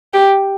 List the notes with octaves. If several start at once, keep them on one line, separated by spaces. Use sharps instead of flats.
G4